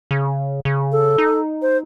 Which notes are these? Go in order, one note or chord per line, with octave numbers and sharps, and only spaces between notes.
C#3
C#3
A4
D#4
C5